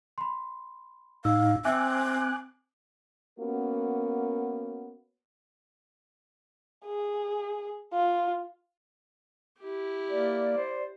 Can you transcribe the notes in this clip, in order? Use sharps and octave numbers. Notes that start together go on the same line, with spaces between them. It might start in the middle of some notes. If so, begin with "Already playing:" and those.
B5 C6
A2 D#4 F5 E6
C4 E5 G5 G#5 D6 E6 F#6
A#3 B3 C#4 F#4 A#4
G#4
F4
E4 G4
A#3 D5
C5